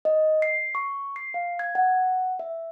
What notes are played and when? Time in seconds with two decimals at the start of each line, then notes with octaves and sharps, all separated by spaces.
0.05 D#5
0.42 C7
0.75 C#6
1.16 C7
1.34 F5
1.59 G#6
1.75 F#5
2.39 E5